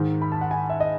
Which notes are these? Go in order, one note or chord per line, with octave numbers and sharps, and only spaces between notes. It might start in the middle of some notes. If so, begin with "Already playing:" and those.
Already playing: G#2 D#3
B5
A5
F#5
G#5
E5
D#5